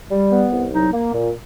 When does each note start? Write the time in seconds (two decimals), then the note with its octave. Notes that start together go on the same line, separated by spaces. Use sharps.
0.11 G3
0.31 B3
0.52 C2
0.72 F#3 D#4
0.93 A#3
1.13 A#2